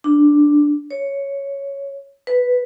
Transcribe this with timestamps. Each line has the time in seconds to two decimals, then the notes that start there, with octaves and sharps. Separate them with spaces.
0.04 D4
0.91 C#5
2.27 B4